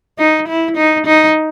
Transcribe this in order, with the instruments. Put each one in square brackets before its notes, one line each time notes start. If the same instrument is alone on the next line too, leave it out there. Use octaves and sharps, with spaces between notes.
[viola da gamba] D#4
E4
D#4
D#4